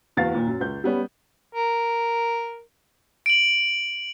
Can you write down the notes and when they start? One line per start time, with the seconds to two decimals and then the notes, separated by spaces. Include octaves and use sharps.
0.17 F#1 E2 F#4 F5 A6
0.33 D#2 A#2
0.47 F#2
0.60 C#2 G6
0.84 G3 B3 C#4
1.54 A#4
3.26 D7 F#7